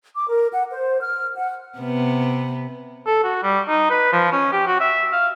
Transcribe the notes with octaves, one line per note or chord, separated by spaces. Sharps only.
D6
A#4
F#5
C5
F6
F#5
C3 B3
A4
F#4
G3
D#4
B4
F3
C#4
G4
F#4
E5
F5